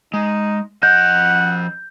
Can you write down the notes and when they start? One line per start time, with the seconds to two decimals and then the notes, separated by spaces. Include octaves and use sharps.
0.14 G#3 D#4
0.83 F3 D#5 F#5 G6